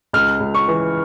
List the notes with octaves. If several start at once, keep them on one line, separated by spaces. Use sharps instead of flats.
C#2 F6
C#2
C#6
E3